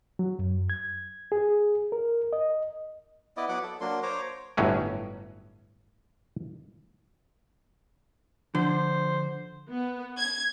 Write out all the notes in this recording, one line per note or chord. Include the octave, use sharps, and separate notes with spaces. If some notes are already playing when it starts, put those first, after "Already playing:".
F#3
F#2
G#6
G#4
A#4
D#5
B3 E4 D5 D#5
F#3 B3 F#5 D6
A4
F#3 A#3 D4 C6
C5 C#5 A#5 D6
G1 A2 F#3 C#4
D3 F3 C5
B3
G#6